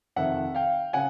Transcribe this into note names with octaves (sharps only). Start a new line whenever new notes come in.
F2 C3 D#3 E5 F#5
F5 G5
C#3 F#5 G#5